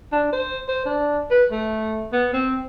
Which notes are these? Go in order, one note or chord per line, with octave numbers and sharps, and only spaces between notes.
D4
C5
C5
D4
B4
A3
B3
C4